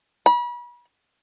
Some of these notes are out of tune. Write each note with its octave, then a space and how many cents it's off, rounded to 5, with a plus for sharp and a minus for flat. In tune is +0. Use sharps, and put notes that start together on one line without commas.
B5 -35